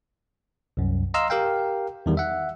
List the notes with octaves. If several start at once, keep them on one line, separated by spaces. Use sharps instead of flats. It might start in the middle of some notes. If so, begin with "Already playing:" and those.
C2 F#2
D#5 F5 A#5 C6 E6 F6
G4 A#4 F5 G5
E2 D#3 G3
E5 F#5